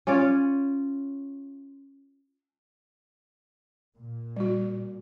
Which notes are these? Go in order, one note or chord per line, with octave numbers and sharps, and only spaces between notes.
C#4 F4 C#5 D5
A#2
G3 F#4